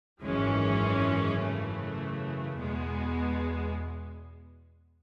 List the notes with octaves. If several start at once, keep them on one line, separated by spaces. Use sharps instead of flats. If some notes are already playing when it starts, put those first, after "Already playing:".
G#1 F#2 E3 G#3 C#4
F#2 C#3 E3 A3
E2 B2 G#3 B3